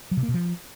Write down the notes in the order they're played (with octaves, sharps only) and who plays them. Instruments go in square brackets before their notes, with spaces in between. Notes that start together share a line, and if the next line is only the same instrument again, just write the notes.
[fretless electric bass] F#3
C3
A#3
B2
F3